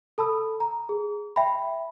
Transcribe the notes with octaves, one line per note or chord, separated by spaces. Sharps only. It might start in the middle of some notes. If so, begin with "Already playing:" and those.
A4 A5 B5 E6
A#5
G#4
E5 G5 A5 B5